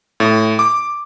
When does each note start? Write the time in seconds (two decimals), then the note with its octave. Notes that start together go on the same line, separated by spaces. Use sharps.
0.20 A2
0.59 D6